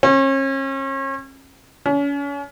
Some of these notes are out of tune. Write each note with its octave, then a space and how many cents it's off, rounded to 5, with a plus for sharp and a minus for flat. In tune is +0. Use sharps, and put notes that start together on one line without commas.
C#4 -40
C#4 +35